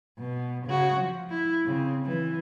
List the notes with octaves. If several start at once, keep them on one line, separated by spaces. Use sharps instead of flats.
B2
C#3 F#4
F3
E4
C#3 C4
E3